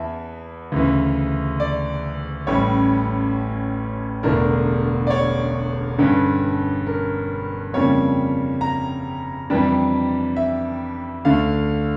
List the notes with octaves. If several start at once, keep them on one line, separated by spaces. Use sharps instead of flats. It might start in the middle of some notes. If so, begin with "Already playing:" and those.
Already playing: E2 E3 E5 A5
D2 C#3 E3
D5
A1 A2 G3 C#4 C#5
E1 E2 D3 A3 D4 A#4
D5
C#5
G2 D3 G3 C#4
A#4
F2 C#3 G3 A#3 D4 C#5
A#5
F2 E3 G3 D4
E5
D2 D3 A3 D4 F5